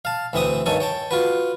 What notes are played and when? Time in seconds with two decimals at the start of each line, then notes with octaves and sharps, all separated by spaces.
0.05 F5 A5
0.33 D2 E3 C4 E5 D#6
0.66 G2 D#3 A4 C#5 G#5
0.80 C#5 G5 A5
1.11 F4 F#4 B4